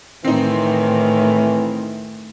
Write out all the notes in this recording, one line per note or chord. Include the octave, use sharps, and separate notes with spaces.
A2 D#3 E3 C4 D#4